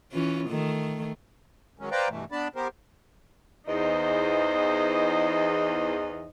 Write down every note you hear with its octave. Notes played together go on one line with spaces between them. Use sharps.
E3 C#4 F4
D#3 A3
D#3 F#3 G#3 C#4
B4 C5 D5 F5 G5 A#5
G2 B2 E3 A3
B3 D4 D5 A5 B5
B3 G4 A#4 C5
E2 D#4 C5 D#5